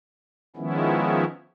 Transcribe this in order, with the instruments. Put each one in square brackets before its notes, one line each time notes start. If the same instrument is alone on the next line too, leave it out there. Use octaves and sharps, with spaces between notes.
[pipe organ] D#3 F3 G#3 B3 C#4 E4